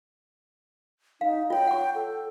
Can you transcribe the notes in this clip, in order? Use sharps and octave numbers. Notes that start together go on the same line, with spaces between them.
D#4 F5
F4 C#5 G5
F#5 C#6
A4